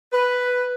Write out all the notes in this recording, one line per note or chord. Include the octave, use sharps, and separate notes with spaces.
B4